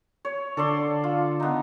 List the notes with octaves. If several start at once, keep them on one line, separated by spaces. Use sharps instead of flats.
C#5
D3 A4 D5 C6
F4
B3 D#4